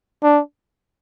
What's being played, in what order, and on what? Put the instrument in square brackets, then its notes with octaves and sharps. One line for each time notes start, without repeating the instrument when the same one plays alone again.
[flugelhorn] D4